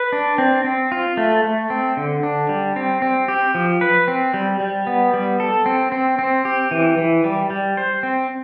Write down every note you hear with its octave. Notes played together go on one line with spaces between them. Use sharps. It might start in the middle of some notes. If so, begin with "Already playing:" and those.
Already playing: B4
D4
C4
C4
F4
A3
A3
C4
D3
D4
G3
C4
C4
G4
F3
B4
C4
G3
G3
B3
G3
A4
C4
C4
C4
G4
E3
E3
G3
G3
C5
C4